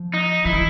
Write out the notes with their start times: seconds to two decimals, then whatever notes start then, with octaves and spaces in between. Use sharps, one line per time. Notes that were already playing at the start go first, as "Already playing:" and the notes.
Already playing: F3
0.14 D#4
0.45 F3 E4
0.54 E3